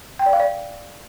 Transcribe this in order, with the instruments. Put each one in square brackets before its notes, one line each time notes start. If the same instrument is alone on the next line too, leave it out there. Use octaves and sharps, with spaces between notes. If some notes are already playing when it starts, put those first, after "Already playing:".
[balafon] G5
D5
F5
D5